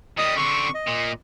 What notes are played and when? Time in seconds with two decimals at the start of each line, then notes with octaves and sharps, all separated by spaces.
0.18 D#3 G3 D#5 D#6
0.37 D3 C4 C#6
0.74 D#5
0.88 A#2